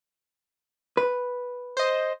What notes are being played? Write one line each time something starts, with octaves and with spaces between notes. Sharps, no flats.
B4
C5 D#5